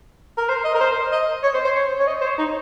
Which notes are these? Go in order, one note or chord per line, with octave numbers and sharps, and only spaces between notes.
A#4
C5
D#5
A#4
C5
D#5
C#5
C5
C5
C#5
C#5
D#5
C5
C#5
D#4